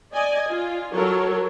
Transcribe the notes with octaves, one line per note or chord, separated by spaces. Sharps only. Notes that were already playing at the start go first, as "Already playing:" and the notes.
D5 D#5 G#5
F4
F#3 A4 A#4 C#5